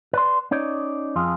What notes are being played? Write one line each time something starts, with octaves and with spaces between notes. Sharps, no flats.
B4 D5 C6
C#4 D#4 C#5 D5
F2 F4 G#4